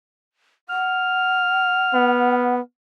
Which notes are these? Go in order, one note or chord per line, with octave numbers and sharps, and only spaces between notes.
F#5 F6
B3